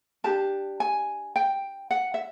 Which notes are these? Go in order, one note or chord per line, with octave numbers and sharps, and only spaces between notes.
D4 G4 A#4 A5
G#5
G5
F#5
E5